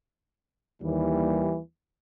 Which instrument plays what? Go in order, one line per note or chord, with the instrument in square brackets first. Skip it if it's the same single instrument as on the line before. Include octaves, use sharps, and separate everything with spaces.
[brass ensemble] D#2 G3 [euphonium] E3